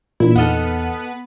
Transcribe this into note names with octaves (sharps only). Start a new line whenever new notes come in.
A#2 E3 A#3 D4 E4
E2 B3 D#4 A4 D#5 F#5 F6